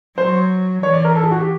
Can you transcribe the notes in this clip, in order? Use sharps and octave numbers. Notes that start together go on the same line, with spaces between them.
F#3 C5
E3 C#5
D5
A#4
A4
G#4
F#4
G4